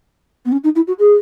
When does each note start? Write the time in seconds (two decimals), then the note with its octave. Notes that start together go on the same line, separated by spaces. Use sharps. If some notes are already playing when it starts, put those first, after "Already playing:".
0.45 B3
0.52 C#4
0.64 D#4
0.75 E4
0.87 F#4
0.99 G#4